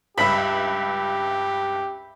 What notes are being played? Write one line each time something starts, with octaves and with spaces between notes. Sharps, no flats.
C#2 G2 G4 E5 B5